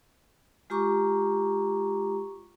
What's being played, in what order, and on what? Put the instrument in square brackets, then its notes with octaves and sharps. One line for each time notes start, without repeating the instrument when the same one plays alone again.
[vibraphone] G#3 F4 G4 A#5 C#6 D6